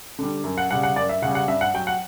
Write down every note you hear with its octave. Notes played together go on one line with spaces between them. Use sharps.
D3 G3
F#2
F#5
C#3 G3 F#5
F#5
F#2 D5
E5
C#3 F#5
G3
F#5
G2 E5
F#5
F#3 G5
F#5